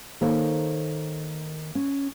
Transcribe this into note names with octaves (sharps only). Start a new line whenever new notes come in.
D#3 A#3 A4 C5 C#5
C#4